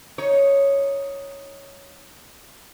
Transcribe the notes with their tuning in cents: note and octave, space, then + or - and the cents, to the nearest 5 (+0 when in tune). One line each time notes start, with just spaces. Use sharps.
D#4 +0 C#5 +0